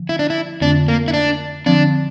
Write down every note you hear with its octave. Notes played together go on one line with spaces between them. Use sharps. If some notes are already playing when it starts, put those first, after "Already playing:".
Already playing: D3 F3
E4
D4
E4
F2 D3 A3 C4 D4
A#3
E4
D4
D3 F3 C4 D4